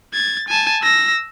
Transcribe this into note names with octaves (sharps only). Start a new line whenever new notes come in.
G#6 A6
G#5 A5
E6 A#6